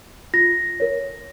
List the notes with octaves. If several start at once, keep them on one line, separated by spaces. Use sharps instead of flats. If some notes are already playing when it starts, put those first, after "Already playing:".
F4 A#6
A#4 C#5